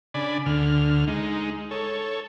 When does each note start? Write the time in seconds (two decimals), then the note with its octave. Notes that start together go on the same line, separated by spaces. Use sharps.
0.14 C#3 D4 D5 G#5 B5
0.46 D2 D3 F6
1.07 G#3 D#4
1.71 A4 C#5